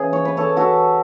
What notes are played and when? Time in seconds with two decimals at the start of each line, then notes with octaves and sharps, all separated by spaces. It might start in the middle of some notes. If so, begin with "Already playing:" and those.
Already playing: C#3 E3 G#4
0.13 C#5
0.25 B4
0.37 A4 C#5
0.57 F#4 A4